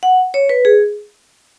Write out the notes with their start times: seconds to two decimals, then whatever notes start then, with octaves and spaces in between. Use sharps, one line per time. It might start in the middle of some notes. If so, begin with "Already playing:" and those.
0.03 F#5
0.34 C#5
0.49 B4
0.65 G#4